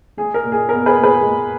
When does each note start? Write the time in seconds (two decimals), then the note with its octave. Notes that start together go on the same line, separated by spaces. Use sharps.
0.17 G#3 G#4
0.34 A#4
0.43 A#2
0.52 G#4
0.69 B3 A#4
0.86 G#4 B4
0.95 A#2
1.03 G#4 B4
1.21 G#3